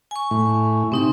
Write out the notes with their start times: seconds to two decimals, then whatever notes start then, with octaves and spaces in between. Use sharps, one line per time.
0.11 G#5 C#6
0.31 A2
0.92 C3 C4 D#4 C6